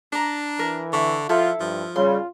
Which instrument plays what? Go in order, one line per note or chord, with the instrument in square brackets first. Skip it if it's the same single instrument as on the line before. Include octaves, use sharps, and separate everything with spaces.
[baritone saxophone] D4 [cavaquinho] D5 A#5
[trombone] E3 [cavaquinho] A#4
[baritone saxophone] D3 [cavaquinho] E5 C#6
[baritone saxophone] F3 [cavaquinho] E4 A4 [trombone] F4
[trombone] G2 [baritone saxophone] F3
[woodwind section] C#3 G3 [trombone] F4 [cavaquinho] C6